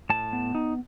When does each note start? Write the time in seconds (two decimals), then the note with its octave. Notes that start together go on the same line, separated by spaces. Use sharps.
0.10 A2 A5
0.33 B3
0.55 D#4